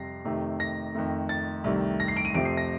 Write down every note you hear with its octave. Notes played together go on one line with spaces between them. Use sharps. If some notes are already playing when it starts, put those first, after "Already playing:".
Already playing: F2 C3 G3 A#6 C7
F2 C3 D#3 A3
A#6
F2 D#3 A3
A6
C2 C3 D#3 A3
A#6
C7
D7
D#7
F2 C3 F3 A3 D7
C7
A#6